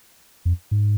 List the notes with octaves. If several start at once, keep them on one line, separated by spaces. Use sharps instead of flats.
F2
G#2